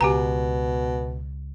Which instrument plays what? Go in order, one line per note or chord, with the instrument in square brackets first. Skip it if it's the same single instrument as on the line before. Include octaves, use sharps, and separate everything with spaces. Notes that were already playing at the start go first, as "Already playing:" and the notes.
[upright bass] C#2 [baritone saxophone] B2 [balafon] G4 G#5 A#5